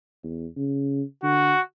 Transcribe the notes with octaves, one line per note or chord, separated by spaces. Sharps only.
E2
C#3
D3 F#4